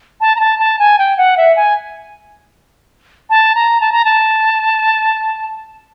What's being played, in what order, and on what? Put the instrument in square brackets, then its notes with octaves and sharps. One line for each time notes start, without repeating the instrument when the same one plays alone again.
[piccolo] A5
A#5
A5
A5
G#5
G5
F#5
E5
G#5
A5
A#5
A5
A#5
A5